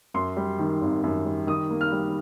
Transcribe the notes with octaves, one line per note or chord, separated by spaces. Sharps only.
F#2 C6
G3
D#3
G#1
F#2
G3
D#3 D#6
A#3
F6
G3